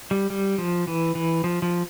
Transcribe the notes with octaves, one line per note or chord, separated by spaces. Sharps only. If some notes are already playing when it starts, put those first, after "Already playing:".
G3
G3
F3
E3
E3
F3
F3